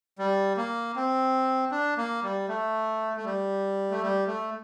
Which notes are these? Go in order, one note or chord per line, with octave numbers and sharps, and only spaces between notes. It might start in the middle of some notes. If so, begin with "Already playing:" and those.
G3
A#3
C4
D4
A#3
G3
A3
A3
G3
A3
G3
A3